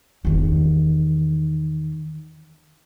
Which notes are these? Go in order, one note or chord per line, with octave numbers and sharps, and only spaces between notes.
E2 D#3